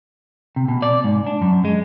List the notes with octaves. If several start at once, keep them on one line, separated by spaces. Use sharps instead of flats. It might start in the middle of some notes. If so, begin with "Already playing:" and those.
C3
B2
D5
G#2
D4
F#2
G#3